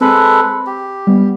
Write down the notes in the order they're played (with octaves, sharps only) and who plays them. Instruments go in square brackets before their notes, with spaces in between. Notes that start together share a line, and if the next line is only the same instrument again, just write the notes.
[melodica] G#3 A4 B4 [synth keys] C4 B5
[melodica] G4
[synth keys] G3 B3